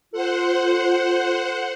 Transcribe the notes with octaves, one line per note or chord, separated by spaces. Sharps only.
F4 A4 C5 F#5